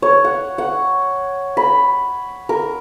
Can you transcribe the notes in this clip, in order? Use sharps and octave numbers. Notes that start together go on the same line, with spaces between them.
C#5
F#5
F#5
B5
A#4